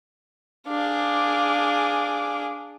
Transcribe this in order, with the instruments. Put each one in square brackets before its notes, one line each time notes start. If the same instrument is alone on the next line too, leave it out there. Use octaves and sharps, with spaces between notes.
[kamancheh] D4 D6 [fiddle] G#4 F5